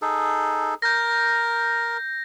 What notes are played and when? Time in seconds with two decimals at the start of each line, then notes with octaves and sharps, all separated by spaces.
0.02 D#4 G#4 A4
0.82 A#4 G6 A#6